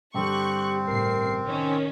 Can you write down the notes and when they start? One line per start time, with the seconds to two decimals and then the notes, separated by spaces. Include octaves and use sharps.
0.15 G2 D3 G3 C4 G4 C#6 F#6
0.87 A1 C3 A#4 C7
1.46 D#3 C#4